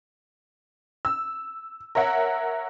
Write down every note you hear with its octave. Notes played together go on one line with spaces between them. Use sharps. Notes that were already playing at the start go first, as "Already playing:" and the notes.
E6
A#4 C#5 E5 F#5